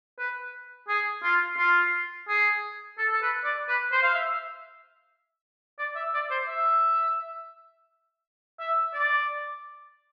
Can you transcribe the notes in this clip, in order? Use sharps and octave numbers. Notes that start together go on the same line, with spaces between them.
B4
G#4
F4
F4
G#4
A4
A4
B4
D5
B4
C5
F5
E5
D5
E5
D5
C5
E5
E5
D5